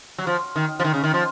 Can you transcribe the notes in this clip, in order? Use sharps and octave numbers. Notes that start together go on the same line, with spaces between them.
F#3
F3
D#3
F3
D#3
C#3
D#3
F3